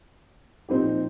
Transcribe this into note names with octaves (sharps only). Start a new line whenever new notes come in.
A#2 F3 C4 D#4 G4